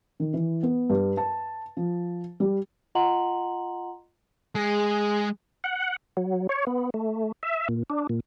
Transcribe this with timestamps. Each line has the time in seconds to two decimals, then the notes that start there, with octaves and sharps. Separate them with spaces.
0.20 D#3
0.34 E3
0.63 B3
0.90 G2
1.17 A5
1.77 F3
2.40 G3
2.95 F4 D#5 F#5 A#5 C6 F#7
4.55 G#3 G#4
5.64 F#5
6.17 F#3
6.49 C#5
6.67 B3
6.94 A3
7.43 E5
7.69 A#2
7.90 D4
8.09 A#2